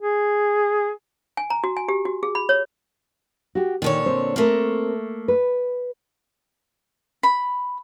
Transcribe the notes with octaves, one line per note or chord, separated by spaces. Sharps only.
G#4
G#5
A#5
F#4
G#5
G4
F#4
G#4
B5
C#5
F#4 G4
A#2 D3 D#3 C#5
C4 C5
A3 A#3 C4 A#4
B4
B5